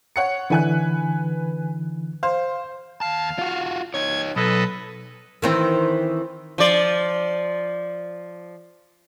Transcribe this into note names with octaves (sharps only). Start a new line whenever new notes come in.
C#5 F#5 C#7
D3 E3 B4 G#5 F#6
C5 F5
D#2 F5 A5
F4 F#4
D#4 C#5 G#6
B1 A4 B4 D#5
D#3 E3 C4
F3 D5